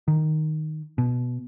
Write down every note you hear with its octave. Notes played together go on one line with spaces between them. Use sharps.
D#3
B2